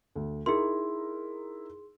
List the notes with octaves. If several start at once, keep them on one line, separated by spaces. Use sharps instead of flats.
D2
D#4 E4 G#4 A#4 C6